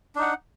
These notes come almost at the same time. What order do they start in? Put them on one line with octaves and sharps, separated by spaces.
D4 D#4 F#5